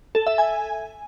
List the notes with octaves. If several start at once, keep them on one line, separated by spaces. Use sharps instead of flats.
A4
E5
G#5